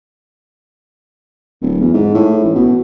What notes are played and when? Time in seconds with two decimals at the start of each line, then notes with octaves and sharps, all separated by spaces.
1.62 D1
1.81 E2
1.94 G#2
2.14 A2
2.44 A1
2.55 B2